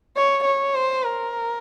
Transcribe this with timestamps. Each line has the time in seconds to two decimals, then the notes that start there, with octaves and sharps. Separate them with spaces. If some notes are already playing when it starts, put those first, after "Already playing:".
0.16 C#5
0.44 C#5
0.74 C5
1.03 A#4